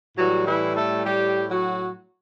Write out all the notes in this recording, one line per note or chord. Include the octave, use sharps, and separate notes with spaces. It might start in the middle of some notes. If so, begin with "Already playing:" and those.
A2 E3 F#3 G3 F#4
E3 E4
A3 A4
G3 G4
F#3 F#4